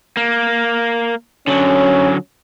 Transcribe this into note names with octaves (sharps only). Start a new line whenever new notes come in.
A#3
D3 F#3 C#4